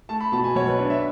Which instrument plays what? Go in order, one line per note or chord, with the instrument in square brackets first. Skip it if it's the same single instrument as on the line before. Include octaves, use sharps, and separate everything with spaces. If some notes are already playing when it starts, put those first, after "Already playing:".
[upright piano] A3 [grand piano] A5
[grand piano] B5
[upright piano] B2 [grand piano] A5
[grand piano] G#5
[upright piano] B1 [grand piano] C#5
[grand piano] B4
[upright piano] D4 [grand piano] C#5
[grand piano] E5